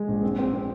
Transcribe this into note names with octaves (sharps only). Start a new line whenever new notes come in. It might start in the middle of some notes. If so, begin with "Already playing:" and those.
Already playing: G#3
A#1
C4
C4
C4